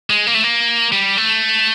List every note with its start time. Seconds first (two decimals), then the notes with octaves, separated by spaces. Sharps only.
0.10 G#3
0.27 A#3
0.34 A3
0.44 A#3
0.92 G3
1.18 A3